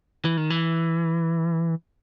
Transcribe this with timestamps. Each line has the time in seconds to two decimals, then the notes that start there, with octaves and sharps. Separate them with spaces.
0.25 E3
0.37 D#3
0.50 E3